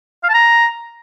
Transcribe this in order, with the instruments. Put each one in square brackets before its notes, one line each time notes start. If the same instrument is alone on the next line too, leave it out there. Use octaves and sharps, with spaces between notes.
[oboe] F5
A5
A#5